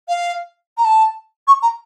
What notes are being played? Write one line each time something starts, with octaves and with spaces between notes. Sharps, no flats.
F5
A#5
A5
C#6
A#5